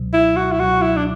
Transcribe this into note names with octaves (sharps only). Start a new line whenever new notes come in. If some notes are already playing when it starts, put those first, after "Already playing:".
Already playing: C#2 B2 F#3
E4
F#4
E4
C#2 B2 F#3 F#4
E4
D4